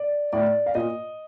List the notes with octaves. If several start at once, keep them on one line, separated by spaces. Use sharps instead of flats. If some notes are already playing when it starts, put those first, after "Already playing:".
Already playing: D5
A2 D5
F5
A#2 D#5